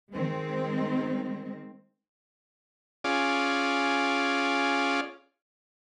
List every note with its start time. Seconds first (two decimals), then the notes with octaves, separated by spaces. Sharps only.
0.13 D#3 G#3 C4
3.04 C#4 F4 G#4 D5